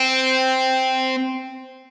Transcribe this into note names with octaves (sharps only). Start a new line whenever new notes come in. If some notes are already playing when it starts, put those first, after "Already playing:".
Already playing: C4